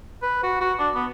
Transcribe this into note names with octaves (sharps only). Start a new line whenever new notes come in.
B4
F#4
F#4
D4
B3